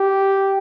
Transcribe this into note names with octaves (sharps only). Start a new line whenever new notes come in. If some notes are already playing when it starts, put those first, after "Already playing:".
Already playing: G4